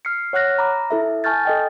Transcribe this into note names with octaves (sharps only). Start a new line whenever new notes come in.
F6 C7 C#7
C#5 F#5 F6 F#6 A#6
A#5 B5 D6 A#6
E4 A4 E5
G#5 A5 C#6 F6 G6 A6
A4 D#5 G5